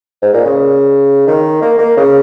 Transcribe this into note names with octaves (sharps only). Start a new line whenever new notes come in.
G#2
A#2
C#3
D#3
A#3
A#3
C#3